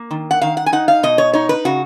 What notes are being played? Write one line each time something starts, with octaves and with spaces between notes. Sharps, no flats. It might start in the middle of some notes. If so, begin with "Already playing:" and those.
Already playing: A#3
D#3
F#5
D#3 F5
F#5
G#5
D#4 F#5
F5
B2 D#5
C#5
D#4 C#5
B4
C#3 F#4